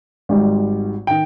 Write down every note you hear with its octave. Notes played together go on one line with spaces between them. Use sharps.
G#1 G#2 G3
D#3 G5